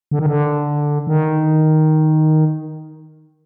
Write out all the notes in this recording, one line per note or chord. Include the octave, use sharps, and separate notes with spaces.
D3
D#3
D3
D#3